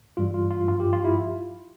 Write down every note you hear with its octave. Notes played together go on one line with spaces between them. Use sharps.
G2 E3 G3 F4
F4
F4
G2 F3 F4
G4
F4
E4